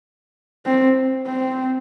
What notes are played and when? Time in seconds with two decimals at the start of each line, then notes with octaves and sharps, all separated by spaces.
0.66 C4
1.27 C4